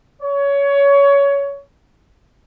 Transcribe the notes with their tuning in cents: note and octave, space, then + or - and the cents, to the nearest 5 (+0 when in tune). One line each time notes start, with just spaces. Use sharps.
C#5 +20